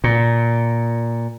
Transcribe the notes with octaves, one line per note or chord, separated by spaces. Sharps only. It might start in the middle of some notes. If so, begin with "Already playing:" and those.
A#2